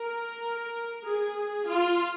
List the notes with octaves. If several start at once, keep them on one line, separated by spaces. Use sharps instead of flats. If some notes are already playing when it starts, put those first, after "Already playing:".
Already playing: A#4
G#4
F4